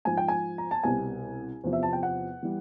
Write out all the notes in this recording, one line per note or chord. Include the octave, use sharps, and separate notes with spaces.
G#2 F3 G#5
G5
G#5
A#5
A5
C2 B2 G3 G#5
E2 C3 F3
E5
A5
G5
F#5
E3 G3